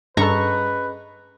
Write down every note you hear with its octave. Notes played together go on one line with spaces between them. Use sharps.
G2 C#4 G#4 A4 B4 D#5 A#5 C#6